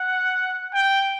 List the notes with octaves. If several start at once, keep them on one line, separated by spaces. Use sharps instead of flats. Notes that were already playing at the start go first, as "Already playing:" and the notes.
Already playing: F#5
G5